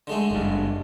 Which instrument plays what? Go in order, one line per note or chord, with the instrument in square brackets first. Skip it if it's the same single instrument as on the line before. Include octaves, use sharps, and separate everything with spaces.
[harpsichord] D3 G#3 A3
[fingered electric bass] F#1 G2